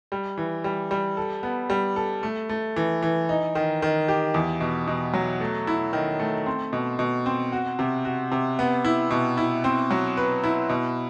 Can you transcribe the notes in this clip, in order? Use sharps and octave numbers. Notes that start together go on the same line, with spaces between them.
G3
E3
G3
G3
A4
B3
G3
A4
A3
A3
E3
E3
D#4
D#3
D#3
G4
E2
B2
B2
F#3
A3
E4
D#3
A3
C4
B2
B2
C4
F#4
C3
F#4
C3
B3
E4
B2
E4
C4
F#3
B4
E4
B2